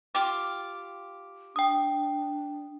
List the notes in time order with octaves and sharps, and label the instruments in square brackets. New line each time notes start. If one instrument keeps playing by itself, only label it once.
[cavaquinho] F4 G4 D6
[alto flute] D4 [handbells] G5 D#6